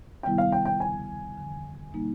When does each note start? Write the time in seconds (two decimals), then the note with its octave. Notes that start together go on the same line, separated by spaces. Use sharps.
0.23 C3 D#3 G3 B3 E4 G5
0.38 F5
0.52 G5
0.65 G5
0.80 D#2 C#3 F3 G#5
1.37 F2 D3 F3
1.93 B2 G3 A#3 D#4